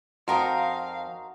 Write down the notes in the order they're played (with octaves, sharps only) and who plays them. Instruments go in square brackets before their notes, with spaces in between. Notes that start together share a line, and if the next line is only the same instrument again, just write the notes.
[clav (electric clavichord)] F2 [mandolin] D#4 A#4 C6 [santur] F#4 [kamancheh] F5